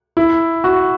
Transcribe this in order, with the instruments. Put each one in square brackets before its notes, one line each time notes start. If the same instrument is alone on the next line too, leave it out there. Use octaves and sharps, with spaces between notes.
[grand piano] E4
F#4